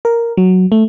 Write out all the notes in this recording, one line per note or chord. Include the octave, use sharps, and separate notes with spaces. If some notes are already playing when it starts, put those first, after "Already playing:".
A#4
F#3
A3